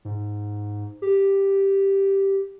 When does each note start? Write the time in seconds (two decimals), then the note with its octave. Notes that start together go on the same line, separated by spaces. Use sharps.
0.05 G#2
1.02 G4